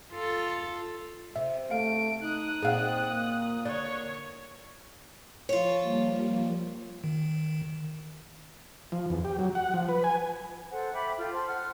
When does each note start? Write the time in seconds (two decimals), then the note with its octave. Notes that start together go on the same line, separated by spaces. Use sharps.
0.13 F4 A4
1.36 C3 E5
1.71 A3 F5 D7
2.23 D#4 D#6 F#6
2.63 A#2 C4 G#4 F5 F#5
3.10 A#3
3.65 D3 C#5 D5
5.49 F3 F4 C#5 A5
5.81 F3 G3 A#3
7.04 D#3
8.92 F3
9.10 E2
9.25 G4
9.39 F#3
9.55 F#5
9.74 F3
9.89 B4
10.04 G#5
10.71 A4 C5 F#5
10.93 E5 G5 B5 D6
11.18 F4 A4 G5
11.33 C5 A5 C6
11.48 F#5 F6